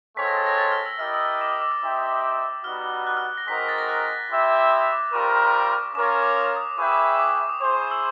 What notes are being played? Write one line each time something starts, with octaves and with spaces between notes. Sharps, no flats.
G#3 C4 F4 A4 C#5 B6
A#6
A6
A#6
A6
F6
E6
E4 G4 A#4 D#5 F6
E6
D6
D#6
D6
E6
D#4 G4 C5 E5 G5
G3 B3 D#4 F#4 F6
F#6
F6
F#6
A#6
G#3 C4 D#4 F#4 A#4 B6
B6
A6
A#6
F#6
E4 G4 C5 E5
D#6
D6
G3 C4 F4 A#4 C#6
C#4 F4 A#4 C#5 D6
C#6
D6
D#6
D#6
E4 G#4 B4 E5 G5 C#6
D6
C#6
D6
D6
D#6
E4 G#4 C5 D6
C#6
D#6
E6